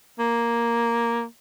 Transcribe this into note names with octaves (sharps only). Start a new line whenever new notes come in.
A#3